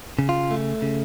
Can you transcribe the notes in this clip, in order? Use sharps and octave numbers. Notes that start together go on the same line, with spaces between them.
C#3
F4
A3
C#3